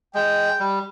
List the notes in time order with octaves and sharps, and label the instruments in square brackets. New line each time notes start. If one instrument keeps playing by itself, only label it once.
[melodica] G#3 [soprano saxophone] G5
[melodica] G3